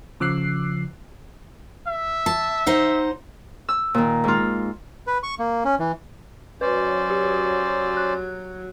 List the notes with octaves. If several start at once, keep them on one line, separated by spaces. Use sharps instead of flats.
C#3 F3 D6 E6 F#6 C7
E5
A5
D#4 C5 F#5
E6
A#2 D#3
G#2 F4
B4
C#6
A#3
C#4
E3
F#3 C#4 B4 C5 D5
G4
F#6